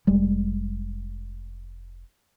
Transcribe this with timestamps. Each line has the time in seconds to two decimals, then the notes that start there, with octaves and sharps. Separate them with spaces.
0.07 F1 G3 G#3